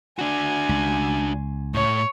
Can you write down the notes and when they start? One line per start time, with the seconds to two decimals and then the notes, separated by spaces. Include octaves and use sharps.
0.19 D4 F#4 G#5
0.69 C#2
1.74 A2 C#5